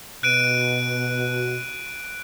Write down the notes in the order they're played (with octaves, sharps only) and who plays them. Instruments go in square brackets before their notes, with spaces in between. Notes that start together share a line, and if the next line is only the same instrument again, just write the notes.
[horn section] B2 [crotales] F#6 D7 D#7